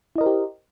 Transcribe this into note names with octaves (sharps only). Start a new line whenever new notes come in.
E4 G4 A#4 C5 D#5